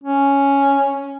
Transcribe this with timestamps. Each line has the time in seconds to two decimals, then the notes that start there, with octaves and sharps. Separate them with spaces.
0.04 C#4